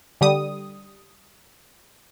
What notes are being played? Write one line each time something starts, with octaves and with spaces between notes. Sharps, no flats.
D3 G3 D#6